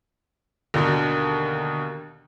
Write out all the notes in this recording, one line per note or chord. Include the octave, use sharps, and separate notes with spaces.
D#2 B2 D3 A#4